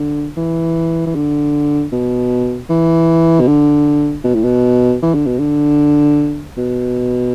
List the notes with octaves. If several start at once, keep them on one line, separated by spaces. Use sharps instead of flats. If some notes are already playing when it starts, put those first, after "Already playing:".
Already playing: D3
E3
E3
D3
B2
E3
B2
D3
B2
A2
B2
E3
D3
B2
D3
B2